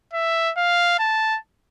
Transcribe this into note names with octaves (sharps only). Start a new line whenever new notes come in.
E5
F5
A5